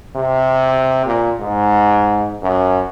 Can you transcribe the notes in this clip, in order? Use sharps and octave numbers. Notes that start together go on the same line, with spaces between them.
C3
A#2
G#2
F#2